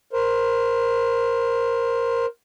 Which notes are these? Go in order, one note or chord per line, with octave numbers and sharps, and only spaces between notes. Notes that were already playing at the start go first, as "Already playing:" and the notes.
A#4 C5